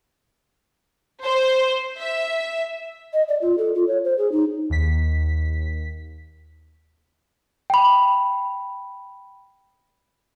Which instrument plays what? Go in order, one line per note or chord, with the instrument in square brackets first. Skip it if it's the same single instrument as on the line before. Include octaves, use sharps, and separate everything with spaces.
[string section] C5
E5
[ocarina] D#5
D5
F4
A4
F4
C#5
C5
G#4
D#4
[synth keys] D#2 B6
[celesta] G5 B5